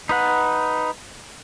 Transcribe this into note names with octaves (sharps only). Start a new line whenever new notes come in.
D#4 B4 F#5